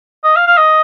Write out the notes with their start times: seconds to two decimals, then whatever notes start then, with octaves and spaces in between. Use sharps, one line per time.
0.24 D#5
0.36 F5
0.47 F5
0.57 D#5